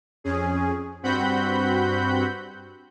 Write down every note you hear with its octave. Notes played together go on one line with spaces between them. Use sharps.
F2 C#4 G#4
G2 C4 F#4 F#5 B5 G6